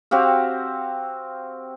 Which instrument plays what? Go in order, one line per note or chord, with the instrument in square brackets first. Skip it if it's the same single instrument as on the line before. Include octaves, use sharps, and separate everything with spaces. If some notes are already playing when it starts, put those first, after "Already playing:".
[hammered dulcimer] C4 F#4 G4 F5